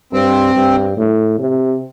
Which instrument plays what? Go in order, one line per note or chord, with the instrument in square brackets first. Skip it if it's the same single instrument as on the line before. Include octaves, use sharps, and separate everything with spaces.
[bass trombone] G2 [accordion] C4
[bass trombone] G2
A2
C3